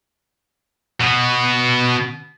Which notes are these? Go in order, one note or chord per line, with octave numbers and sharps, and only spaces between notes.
B2 B3